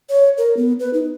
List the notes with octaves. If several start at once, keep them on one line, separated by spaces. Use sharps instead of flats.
C#5
A#4
B3
B4
D#4